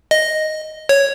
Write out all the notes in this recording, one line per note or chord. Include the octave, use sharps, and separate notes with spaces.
D#5
C#5